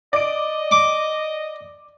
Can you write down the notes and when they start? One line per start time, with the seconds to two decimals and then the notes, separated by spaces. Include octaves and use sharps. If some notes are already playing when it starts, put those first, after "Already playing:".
0.13 D5 D#5 D7
0.71 D6